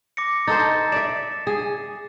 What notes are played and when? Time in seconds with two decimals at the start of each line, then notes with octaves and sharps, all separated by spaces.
0.17 D6 A#6 C#7
0.47 D#4 A4 C5 A6
0.92 D5 E5 E7
1.47 G#4